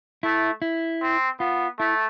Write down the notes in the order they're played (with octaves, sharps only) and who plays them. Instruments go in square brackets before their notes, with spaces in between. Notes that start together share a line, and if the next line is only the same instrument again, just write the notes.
[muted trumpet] A3 [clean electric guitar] E4
[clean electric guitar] E4
[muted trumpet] C4
[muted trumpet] B3 [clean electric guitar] F4
[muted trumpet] A3 [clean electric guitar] E4